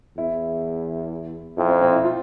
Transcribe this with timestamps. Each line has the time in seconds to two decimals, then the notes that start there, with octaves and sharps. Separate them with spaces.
0.17 E2 E4
1.57 F2 E4
1.69 C4
1.82 C4
1.92 E4
2.04 F4